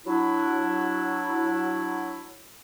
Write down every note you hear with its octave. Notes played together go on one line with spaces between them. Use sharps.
F#3 D4 E4